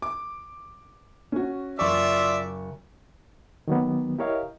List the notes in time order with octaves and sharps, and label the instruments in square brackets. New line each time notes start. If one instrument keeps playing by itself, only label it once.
[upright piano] D6
C#4 F#4
[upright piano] F#1 C#6 [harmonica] F4 D5 E5
[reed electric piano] D#3 F#3 A#3 B3
E4 G4 A#4 C#5 D#5 F5